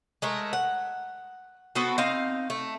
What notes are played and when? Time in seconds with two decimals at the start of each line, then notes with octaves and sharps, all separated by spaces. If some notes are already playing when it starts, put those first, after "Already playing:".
0.22 G#3 A3 A#4
0.53 F#5
1.75 B3 C4 F#4 A4
1.98 C4 D#4 F5
2.50 A3